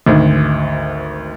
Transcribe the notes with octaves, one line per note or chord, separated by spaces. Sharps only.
G#1 D2